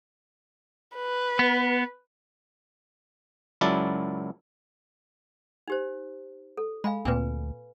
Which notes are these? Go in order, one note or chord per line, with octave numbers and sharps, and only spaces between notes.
B4
B3
C#2 F#2 F#3 E4 D5 A5
D#4 G4 C5
A4
G#3 F5 G#5 B5
D2 A#2 A#3 C4 B4 G#5